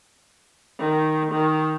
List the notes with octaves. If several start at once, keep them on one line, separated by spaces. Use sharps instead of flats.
D#3
D#3